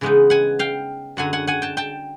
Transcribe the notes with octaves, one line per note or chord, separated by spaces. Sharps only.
C#3 E3 G#3 B3 D#4
F#5 G#5
F5 G5
F#2 D3 F#3 F#5 G#5
F#5 G#5
F#5 G#5
G5 A5
G5 A5